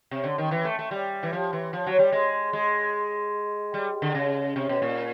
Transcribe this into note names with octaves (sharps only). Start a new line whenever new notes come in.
C3
D3
D#3
E3
A3
A3
G3
E3
F3
E3
F3
F#3
G3
G#3
G#3
G3
D3
C#3
C3
B2
A#2